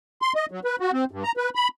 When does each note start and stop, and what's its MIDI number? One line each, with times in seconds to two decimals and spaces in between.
0.22 0.33 84
0.35 0.46 75
0.51 0.60 54
0.64 0.76 71
0.80 0.91 66
0.93 1.05 60
1.11 1.23 43
1.24 1.32 82
1.37 1.50 71
1.55 1.68 83